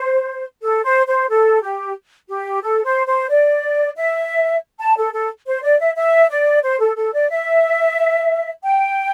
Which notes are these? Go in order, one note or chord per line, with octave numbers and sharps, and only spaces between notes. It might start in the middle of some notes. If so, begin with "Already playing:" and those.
Already playing: C5
A4
C5
C5
A4
G4
G4
A4
C5
C5
D5
E5
A5
A4
A4
C5
D5
E5
E5
D5
C5
A4
A4
D5
E5
G5